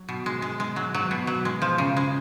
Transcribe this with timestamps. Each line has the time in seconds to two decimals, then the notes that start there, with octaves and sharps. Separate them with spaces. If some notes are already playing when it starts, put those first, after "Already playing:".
Already playing: F#3
0.09 B2
0.26 G#3
0.42 G#3
0.60 G#3
0.76 F#3
0.95 F#3
1.11 B2
1.27 F#3
1.45 G#3
1.62 F3
1.78 C#3
1.97 G#3